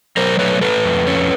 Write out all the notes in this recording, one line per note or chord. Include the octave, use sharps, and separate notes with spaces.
F#3 A#4 C5
A3 B4 C#5
A3 A4 B4
F2
C#4